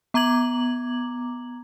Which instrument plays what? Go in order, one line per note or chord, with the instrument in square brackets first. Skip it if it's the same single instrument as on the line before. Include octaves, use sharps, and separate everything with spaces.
[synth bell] B3 A#5 D6 G#6 F#7